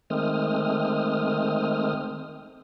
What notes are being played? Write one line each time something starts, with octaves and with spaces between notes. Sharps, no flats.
D#3 G#3 A3 C4 D#6 F6